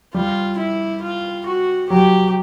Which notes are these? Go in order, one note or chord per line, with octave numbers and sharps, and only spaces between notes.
G3 F4
E4
F4
F#4
F#3 G4